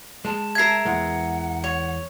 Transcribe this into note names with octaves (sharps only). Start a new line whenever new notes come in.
G#3 A5
A#4 E5 G#6 C7
E2 E3 G#3 F#5
C#5